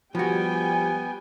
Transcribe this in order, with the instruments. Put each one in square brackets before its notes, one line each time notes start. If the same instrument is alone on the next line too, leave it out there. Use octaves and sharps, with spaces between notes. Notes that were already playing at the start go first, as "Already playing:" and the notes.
[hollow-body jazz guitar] F3 F#4 [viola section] G3 G5 G#5 [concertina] B3